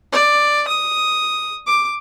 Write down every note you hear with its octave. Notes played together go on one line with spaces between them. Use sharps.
D5
D#6
D6